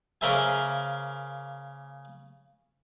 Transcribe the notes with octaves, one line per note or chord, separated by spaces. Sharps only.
C#3 A#3 A#4 C5 E5 G#5